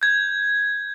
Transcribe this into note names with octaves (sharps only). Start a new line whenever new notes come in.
G6 G#6